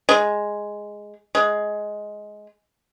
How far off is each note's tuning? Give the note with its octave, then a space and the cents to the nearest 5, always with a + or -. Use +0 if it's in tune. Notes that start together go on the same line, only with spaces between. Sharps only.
G#3 +0
G#3 +10